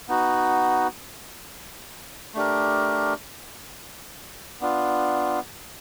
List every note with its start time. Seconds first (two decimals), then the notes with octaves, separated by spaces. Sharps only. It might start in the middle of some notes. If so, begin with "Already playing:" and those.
0.09 B3 D#4 F#4
2.35 A3 D4 G4 A#4
4.61 B3 D4 F4